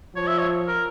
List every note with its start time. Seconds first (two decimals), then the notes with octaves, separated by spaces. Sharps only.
0.15 F3 C#5
0.27 E5
0.38 C#5
0.68 A#4